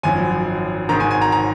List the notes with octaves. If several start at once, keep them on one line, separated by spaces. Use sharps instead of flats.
G#1 F#2 F3 G#5
G#1 G#2 D#3 A#5
G#5
G#5
A#5
A#5